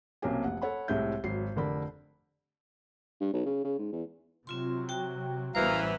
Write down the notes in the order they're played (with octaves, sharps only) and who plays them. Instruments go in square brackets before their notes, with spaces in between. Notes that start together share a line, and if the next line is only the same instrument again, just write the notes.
[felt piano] B1 C3 A#3 C#4 G4 G#5
F1 F#5
A4 C#5 F#5 B5
C2 A2 G#3 E5 G6
G#1 F#3 C7
F1 D3 A#4 D5 B5
[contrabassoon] G2
B1
C#3
C#3
G#2
E2
[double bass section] C3 F#3 [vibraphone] C4 F4 C6
[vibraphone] F#4 G5
[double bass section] A1 G3 B3 [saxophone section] F#2 E3 [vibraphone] C5 [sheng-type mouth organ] F5 A#5